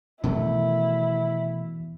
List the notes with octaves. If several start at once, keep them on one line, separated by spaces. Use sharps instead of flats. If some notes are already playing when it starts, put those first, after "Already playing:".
E2 B2 D#3 A3 E4